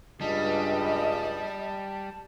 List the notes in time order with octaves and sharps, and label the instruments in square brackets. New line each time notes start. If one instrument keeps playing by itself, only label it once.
[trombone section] C#2 G2 [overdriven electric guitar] G3 [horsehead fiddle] D#5 [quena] A5